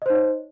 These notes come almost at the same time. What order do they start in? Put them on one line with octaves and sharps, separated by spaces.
D#5 C5 D#4 C#5